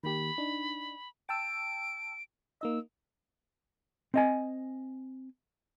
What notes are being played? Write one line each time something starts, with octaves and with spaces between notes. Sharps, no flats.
D#3 A#3 G4 B5
D4 D#4
G5 A5 E6 D7
A#3 D#4 D#5 E6
C4 D#5 G#5